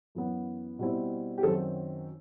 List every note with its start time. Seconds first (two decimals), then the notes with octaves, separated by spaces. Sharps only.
0.15 F#2 E3 B3
0.79 B2 G3 C4 E4
1.38 G4
1.43 F#2 D#3 F#3 C4 A4